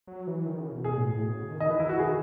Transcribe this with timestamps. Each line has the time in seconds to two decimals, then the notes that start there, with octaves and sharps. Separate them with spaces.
0.08 F#3
0.27 E3
0.46 D#3
0.59 C#3
0.72 B2
0.84 B2 G#4
0.97 A2
1.10 A2
1.23 B2
1.35 C#3
1.48 D#3
1.60 D#3 D#5
1.69 E3 B4
1.76 D#3 E4
1.89 F#4
1.99 G#4